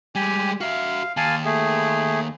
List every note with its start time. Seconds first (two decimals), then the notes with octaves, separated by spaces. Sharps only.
0.15 G3 G#3 G4 G#5
0.61 F#4 E5 F5
1.17 D#2 F5 G#5 A5
1.45 A3 G#4